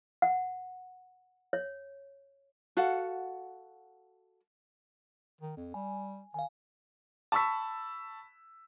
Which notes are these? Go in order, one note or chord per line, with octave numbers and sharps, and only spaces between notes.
F#5
C#5
F#4 A4 F5 F#5
D#3
F2
G3 G#5
D#3 F5 G#5
A5 B5 C#6 E6 B6